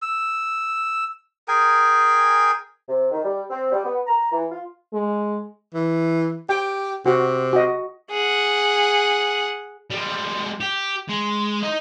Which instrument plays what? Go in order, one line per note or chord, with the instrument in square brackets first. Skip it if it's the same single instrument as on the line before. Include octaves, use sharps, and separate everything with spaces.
[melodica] E6
G#4 A#4 G5 G#5
[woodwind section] C3
D#3
G3
C4
G3
B3
A#5
E3
F4
[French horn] G#3
[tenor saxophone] E3
[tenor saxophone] G4 [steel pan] G5
[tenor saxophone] C3 [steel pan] F#4
[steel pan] F#4 D#5
[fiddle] G#4 F#5
[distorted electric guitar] G3 G#3
G4
G#3
D#4 D#5